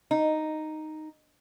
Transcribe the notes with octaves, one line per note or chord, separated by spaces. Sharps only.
D#4